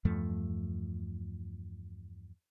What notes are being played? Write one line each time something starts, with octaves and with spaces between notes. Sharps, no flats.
E2 G2 F3 A3